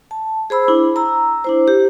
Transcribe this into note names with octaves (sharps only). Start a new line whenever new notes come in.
A5
G#4 C5 B5 E6
D4 E4
A#5 E6
D4 E4 C5
G4